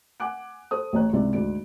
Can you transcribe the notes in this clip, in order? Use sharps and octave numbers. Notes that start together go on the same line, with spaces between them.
F#5 G#5 D6 F#6 D7
A4 C5 D#6
A1 A2 C#5 A#5 F#6
C#2 G#2 C3 C4 E4 D5
D2 G#2 D5 D7